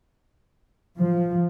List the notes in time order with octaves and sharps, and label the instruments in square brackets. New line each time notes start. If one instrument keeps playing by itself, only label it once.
[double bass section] F3